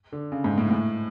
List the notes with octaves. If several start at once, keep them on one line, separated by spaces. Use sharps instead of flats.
D3
C#3
G#2
A2
A2